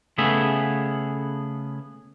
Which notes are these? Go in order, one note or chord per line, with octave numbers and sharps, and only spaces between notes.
C#3 A3 B3 G#4 E5